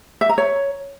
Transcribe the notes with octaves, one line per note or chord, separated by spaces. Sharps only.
E5
A#5
C#5